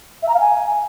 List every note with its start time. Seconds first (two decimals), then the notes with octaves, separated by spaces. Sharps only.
0.22 E5
0.28 A#5
0.33 F5
0.39 G#5